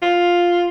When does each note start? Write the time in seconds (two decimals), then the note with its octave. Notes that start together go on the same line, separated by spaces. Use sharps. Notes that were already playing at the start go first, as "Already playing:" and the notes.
0.02 F4